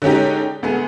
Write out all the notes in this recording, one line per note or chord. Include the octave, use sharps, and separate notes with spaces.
D3 G#3 C#4 D#4 G4
D2 B3 G#4